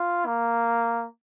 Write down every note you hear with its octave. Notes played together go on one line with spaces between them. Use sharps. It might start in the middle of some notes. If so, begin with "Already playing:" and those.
Already playing: F4
A#3